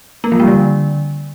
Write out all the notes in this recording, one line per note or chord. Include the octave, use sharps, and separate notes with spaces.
A#3
F3
G3
D3